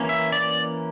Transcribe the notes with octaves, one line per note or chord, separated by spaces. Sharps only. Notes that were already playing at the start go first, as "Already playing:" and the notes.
Already playing: E3 A#3 C#4
E5
D5